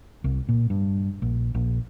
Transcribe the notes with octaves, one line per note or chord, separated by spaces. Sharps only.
C2
A#2
G2
A#1
A#1